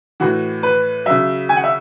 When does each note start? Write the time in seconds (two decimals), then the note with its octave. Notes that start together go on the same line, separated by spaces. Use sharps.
0.20 A2 E3 F#4
0.63 B4
1.06 C#3 F#3 E5
1.49 G#5
1.57 F#5
1.64 E5